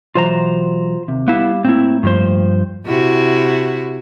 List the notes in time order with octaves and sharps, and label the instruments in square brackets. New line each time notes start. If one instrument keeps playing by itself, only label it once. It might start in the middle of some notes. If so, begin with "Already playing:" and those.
[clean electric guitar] B2 E3 F#3 [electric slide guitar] F4 C5 A#5
[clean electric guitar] D#2 C3
[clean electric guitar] G3 F5 [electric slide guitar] B3 E4
[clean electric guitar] A2 A#3 [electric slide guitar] C4 E4
[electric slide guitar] G2 F3 C5
[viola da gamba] C3 E4 F#4